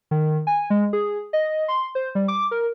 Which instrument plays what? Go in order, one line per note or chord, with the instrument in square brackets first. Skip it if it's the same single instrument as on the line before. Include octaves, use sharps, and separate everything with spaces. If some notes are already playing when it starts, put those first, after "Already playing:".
[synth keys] D#3
G#5
G#3
G#4
D#5
C6
C5
G3
D6
A#4